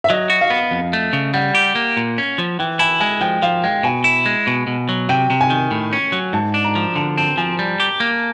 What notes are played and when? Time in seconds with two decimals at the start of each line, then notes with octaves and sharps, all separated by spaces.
0.04 E5
0.10 F#3 D#5
0.30 F#4
0.41 F5
0.50 B3
0.71 F2
0.93 A3
1.13 C#3
1.34 G3 F#5
1.55 G4
1.75 A#3
1.97 A#2
2.18 C#4
2.38 F3
2.59 E3 G5
2.79 E4 G#5
3.00 G#3 G#5
3.21 F3 G5
3.42 F3 F5
3.64 G#3 G5
3.83 B2 G#5
4.04 E4
4.26 G#3
4.47 B2
4.67 B2
4.89 F#3
5.09 C3 G5
5.30 C3
5.41 G#5
5.50 D#3
5.71 A2
5.93 C#4
6.12 F#3
6.33 G#2 A5
6.54 D4
6.64 A#5
6.75 F3
6.96 D3 A5
7.18 C4 A5
7.38 F3 G#5
7.59 G3
7.80 G4
8.00 A#3